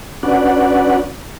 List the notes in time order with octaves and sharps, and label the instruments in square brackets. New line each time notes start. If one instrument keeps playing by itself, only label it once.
[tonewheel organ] C#4 D4 F#4 B4 D5 F#5